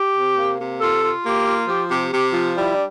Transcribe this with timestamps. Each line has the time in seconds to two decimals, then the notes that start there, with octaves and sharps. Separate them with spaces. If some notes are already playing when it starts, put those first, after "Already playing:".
Already playing: G4
0.15 C3
0.37 A#3
0.59 C3
0.81 F4 A4
1.02 F4
1.24 A#3 G4
1.46 F4
1.67 F3 G4
1.90 C3 G4
2.11 C3 G4
2.33 F3 F4
2.55 G3 E4
2.75 D4